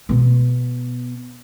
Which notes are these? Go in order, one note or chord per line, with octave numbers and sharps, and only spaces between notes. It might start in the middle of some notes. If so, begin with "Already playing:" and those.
B2 B3